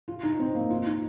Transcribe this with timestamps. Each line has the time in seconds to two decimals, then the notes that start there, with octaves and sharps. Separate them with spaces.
0.08 F4
0.23 D#4
0.39 C4
0.55 A#3
0.70 F4
0.86 D#4